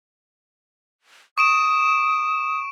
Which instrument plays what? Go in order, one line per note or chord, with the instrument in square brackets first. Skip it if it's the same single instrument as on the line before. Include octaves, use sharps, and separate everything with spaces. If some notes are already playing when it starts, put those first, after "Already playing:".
[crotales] C#6 D7 E7 [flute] D#6